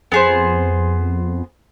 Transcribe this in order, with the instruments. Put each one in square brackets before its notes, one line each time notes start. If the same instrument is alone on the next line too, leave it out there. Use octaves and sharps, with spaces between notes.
[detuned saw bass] F2 [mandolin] B3 G#4 C5